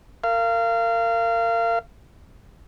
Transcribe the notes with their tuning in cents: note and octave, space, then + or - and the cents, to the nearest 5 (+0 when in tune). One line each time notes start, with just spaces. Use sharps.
A#4 -25 F5 -25